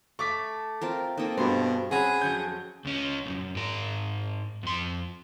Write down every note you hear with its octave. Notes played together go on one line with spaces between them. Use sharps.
A3 C#6 D6 B6
C4 F4 A#4
A#3 C4 D#4 A4
G2 B2 D4 G#4 C5
C4 C#4 G#4 F#5 B5
F2 F#3 C#4 G6
C#2 C#4
B1 F#2
G#2 A#4
F2 C6